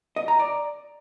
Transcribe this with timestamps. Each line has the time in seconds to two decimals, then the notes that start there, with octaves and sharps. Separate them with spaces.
0.16 D#5
0.28 A#5
0.40 D5